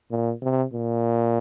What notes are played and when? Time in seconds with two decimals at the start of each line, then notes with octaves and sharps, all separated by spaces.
0.11 A#2
0.42 C3
0.74 A#2